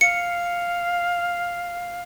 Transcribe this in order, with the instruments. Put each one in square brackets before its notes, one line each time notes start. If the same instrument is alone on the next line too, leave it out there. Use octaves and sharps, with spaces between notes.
[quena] F5 [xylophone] C#7